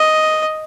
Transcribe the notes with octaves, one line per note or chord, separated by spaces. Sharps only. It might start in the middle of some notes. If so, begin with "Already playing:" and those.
Already playing: D#5